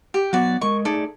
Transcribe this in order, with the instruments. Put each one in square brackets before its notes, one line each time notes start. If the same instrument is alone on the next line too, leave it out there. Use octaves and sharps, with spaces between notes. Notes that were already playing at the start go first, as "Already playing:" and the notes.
[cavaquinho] G4
[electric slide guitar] F#3 B3 [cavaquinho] F#4 D5
[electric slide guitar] G#3 A#4 D#5 [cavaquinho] C#6
[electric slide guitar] A3 D#4 G#4 [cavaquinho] A4 D5